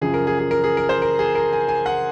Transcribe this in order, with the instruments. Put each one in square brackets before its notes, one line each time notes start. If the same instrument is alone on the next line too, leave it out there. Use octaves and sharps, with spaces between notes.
[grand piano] F#2 C#3 F3 G#4
A#4
G#4
G#4
A#4
G#4
A#4
C5
A#4
G#4
A#4
G#5
G#5
F#5